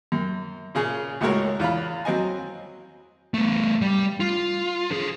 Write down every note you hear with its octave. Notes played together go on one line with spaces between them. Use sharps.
F#2
A#2 C#3 G#4
C#2 A2 G#3 F#4 A#4 C#5
E2 F4 F5 B5
F#3 C4 D#5 G#5
A3 B3
G3
F4
D3 G#4